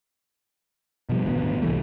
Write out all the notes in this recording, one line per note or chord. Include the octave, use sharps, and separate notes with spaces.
B2 F3 G3
D#1 G#1 D2 B3
C2 A2 E3 A3